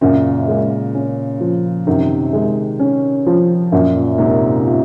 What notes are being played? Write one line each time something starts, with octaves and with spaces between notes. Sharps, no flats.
F#2 A#2 C#3
G#3
C#4
F3
F#2 C3 D#3
G#3
C#4
F3
F#2 A#2
A#2
G#2 C3 A#3
F4